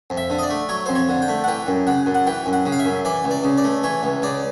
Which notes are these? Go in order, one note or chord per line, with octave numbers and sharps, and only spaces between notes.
F2
E5
D3
D#5
D5
A3
F#3 C#5
F2 C5
C#5
D3
G5
A3
F#5
E3 G5
F#2
C#3 F#5
F#2
F#5
E3 G5
F#2
F#5
C#3
F5
E5
F#2
E3 D5
C#2
D5
C#3
D5
A3
E3 C#5
C#2
C#3 D5